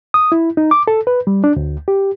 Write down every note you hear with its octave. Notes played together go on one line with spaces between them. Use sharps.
D#6
E4
D#4
D6
A4
B4
G3
D4
D2
G4